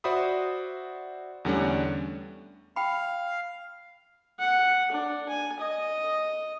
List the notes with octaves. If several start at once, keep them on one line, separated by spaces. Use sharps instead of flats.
F#4 C5 D5 E5 B5 D#6
E2 D3 G3 A3 C#4 D4
F5 G5 B5
F#5
D4
G#5
D#5